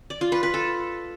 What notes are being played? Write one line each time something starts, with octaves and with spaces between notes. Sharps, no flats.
D5
F4
B4
B4
A4